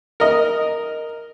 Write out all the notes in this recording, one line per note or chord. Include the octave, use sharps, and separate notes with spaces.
A#4 D#5